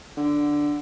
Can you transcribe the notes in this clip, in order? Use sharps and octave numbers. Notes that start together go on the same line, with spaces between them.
D3